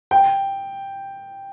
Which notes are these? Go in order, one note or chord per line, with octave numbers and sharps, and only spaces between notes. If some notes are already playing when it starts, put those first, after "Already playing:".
G5